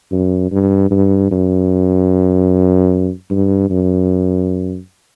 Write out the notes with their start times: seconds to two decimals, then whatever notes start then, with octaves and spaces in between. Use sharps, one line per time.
0.12 F#2
0.52 G2
0.91 G2
1.31 F#2
3.30 G2
3.70 F#2